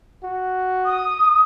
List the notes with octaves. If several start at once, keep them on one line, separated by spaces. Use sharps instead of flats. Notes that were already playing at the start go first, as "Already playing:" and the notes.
F#4
D#6